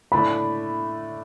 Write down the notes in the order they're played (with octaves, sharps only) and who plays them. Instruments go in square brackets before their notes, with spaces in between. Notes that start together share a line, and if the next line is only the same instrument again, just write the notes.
[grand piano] A2 A3 D4 [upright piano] B5